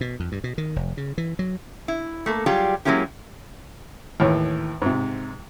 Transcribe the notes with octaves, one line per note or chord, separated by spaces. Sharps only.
B2
F2
G2
B2
D#3
F1
C#3
E3
F#3
E4
A3 A#3 A4
F#3 G3 F4 G4 G#4
F#3 G#3 A#3 C#4 E4 G4
D#2 A2 E3
G#2 C3